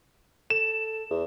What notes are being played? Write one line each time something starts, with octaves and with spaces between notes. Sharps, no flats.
A4 E7
E2